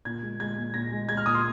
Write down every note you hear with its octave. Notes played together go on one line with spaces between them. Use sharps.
A#2 G#6
G#3
G#3 G#6
A#2
A#2 A#6
G#3
G#3 G#6
F6
A#2 D#6
C6